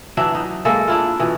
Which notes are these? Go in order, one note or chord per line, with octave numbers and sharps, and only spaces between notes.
E3 F#3 D4 E5
D#4
G#3 A#3 A4 E5
D4 E4 F4
B2 E3